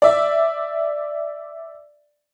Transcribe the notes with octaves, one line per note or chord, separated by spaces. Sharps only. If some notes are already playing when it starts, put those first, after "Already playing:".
D5 E5